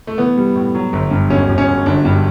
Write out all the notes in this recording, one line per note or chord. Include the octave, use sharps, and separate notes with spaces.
A3
E3 B3
G3
A2
F#3
G1
G2
E1 C#4
E1
C#4
E1
G1 D4
G2